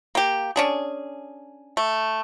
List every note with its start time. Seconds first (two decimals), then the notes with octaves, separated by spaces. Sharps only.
0.15 A#3 G4
0.56 C#4 D4 G#4
1.77 A3